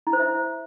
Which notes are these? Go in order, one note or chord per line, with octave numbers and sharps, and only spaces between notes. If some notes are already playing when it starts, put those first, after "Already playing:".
E4
C5
E5